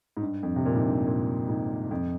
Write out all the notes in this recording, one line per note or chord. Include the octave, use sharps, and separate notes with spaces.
G#2
G2
F2
C3
A#2
G#2
G2
A#2
G#2
F2